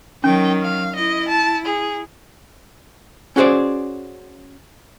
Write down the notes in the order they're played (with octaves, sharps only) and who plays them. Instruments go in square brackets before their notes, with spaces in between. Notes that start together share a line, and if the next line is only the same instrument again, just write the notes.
[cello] D#3 F#3 [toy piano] C#4 [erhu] G5
[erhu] F5
[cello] E4 [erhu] D#5
[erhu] A5
G#4
[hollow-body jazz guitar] C#4 F#4 G#4 C5 D5